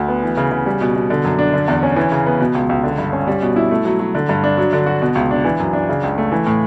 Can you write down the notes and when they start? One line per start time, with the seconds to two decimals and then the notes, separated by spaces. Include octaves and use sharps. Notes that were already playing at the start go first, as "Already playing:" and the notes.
Already playing: D2
0.08 B3
0.23 E3
0.37 C#3
0.51 C#3
0.66 G3
0.81 B2
0.96 B2
1.10 D3
1.24 F#2
1.39 D4
1.53 D3
1.68 E2
1.83 C#4
1.96 E3
2.12 C#3
2.26 B3
2.40 B2
2.55 C#2
2.69 C#2
2.83 D3
2.99 G2
3.13 C#4
3.27 G3
3.42 B2
3.56 E4
3.71 A3
3.85 F#3
3.99 F#3
4.15 D3
4.29 G2
4.44 D4
4.57 F#3
4.73 D3
4.86 F#4
5.02 B2
5.15 C#2
5.31 D4
5.45 E3
5.60 F#2
5.73 D4
5.89 C#3
6.03 C#2
6.18 A3
6.32 E3
6.46 A2